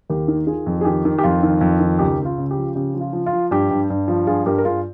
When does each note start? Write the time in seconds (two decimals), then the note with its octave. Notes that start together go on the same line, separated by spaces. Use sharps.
0.10 D#2 G4 A#4
0.28 D#3
0.47 D#3 F4 G#4
0.66 F2
0.81 G#4
0.85 D#3 G4
1.05 D#3
1.18 G4
1.23 F2 F4
1.43 D#3
1.61 F2
1.80 D#3
1.99 C#2 G4
2.18 C#2
2.25 F4
2.38 C#3
2.51 G4
2.57 F3
2.76 C#3 G4
2.94 F3
3.01 F4
3.13 F3
3.26 F4
3.33 F3
3.51 G2 G4
3.71 G2
3.90 G2
4.08 F3
4.27 G2 F4 G#4
4.46 G2 G4 A#4
4.58 A#4
4.65 G2 F4 G#4